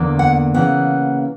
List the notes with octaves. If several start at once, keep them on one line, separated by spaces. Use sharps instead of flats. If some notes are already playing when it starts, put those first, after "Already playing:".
Already playing: E2 D3 A#3
F#5
C#3 E3 A#3 F#5